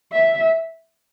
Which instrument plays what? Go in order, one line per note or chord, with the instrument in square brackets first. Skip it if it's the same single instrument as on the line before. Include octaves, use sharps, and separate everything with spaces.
[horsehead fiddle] E5